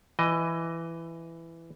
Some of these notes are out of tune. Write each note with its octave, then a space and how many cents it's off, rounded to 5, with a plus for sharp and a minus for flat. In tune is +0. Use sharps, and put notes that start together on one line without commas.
E3 +10 D#5 +0